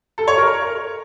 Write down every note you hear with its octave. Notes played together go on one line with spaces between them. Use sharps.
A4
C#5
A#4